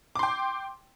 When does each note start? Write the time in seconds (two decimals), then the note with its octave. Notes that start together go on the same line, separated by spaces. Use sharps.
0.16 D6
0.19 C6
0.23 G5